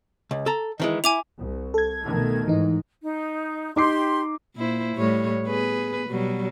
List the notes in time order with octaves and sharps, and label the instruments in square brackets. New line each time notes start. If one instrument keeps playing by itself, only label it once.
[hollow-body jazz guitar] C#2
A4 A#5
D#3 E3 G#3
[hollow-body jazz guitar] E4 [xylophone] G#5 D6 F7
[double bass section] C2
[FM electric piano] A4 G#6
[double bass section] B2 D#3 A3
[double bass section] G#2 [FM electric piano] E3 D#4
[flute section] D#4
[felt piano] D#4 D6 C7 [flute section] G4 C6
[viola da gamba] A#2 E4 C5
A2 G3 C#5
B3 G#4 B4
B2 F#3 G3